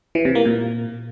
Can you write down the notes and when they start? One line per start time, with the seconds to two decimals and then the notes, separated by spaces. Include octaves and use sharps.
0.15 E3
0.25 C3
0.35 A#3
0.45 A#2